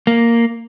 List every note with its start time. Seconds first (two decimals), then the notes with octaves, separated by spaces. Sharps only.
0.07 A#3